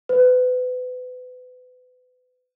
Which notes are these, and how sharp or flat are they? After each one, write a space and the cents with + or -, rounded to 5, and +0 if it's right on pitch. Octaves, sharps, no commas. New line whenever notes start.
B4 +30